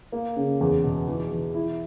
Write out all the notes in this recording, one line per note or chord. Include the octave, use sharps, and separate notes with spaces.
A#3
C#3
E2
B2
E3
E3
E4